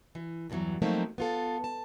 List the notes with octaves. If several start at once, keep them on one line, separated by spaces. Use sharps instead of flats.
E3
E2 G2 D3 E3 F#3
F3 F#3 A3 A#3 C4 D#4
B3 F4 A4
A5